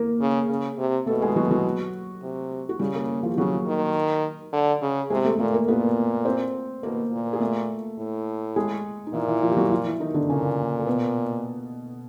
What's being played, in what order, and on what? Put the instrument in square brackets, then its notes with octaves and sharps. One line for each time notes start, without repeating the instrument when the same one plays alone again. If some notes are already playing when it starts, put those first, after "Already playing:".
Already playing: [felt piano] A#3 A#4
[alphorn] C#3
C#3
C3
[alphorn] B2 [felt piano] A3 A4
[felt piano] G#3 G#4
F#3 F#4
F#3 F#4
[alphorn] C3
[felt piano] F#4
[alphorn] C#3 [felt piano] G3 G4
[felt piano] A#3 A#4
F3 F4
G4
[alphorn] C#3 [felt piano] F#3 F#4
[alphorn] D#3
D3
C#3
[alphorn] C3 [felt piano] G#3 G#4
[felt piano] A3 A4
[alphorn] A#2 [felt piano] A3 A4
[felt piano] A#3 A#4
[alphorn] A#2 [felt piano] B3 B4
[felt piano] C4 C5
[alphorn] B2 [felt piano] A#3 A#4
[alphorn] A#2
[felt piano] G#4
A3 A4
[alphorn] A2
[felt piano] G#3 G#4
D#4
[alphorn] A#2 [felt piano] E3 E4
[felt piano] E3 E4
F3 F4
G4
F#3 F#4
F3 F4
E3 E4
D#3 D#4
D3 D4
[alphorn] A#2 [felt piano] C#3 C#4
[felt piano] A#3
B2 B3